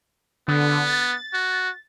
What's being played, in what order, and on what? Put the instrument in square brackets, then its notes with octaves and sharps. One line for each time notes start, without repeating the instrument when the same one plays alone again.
[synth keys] D3 [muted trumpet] B3
[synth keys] A6
[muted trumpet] F#4